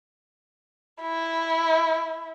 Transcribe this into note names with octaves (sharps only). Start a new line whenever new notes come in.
E4